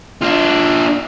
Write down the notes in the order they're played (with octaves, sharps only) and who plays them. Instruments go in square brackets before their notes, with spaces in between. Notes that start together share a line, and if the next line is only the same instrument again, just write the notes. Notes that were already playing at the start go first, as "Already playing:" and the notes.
[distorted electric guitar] D4 F4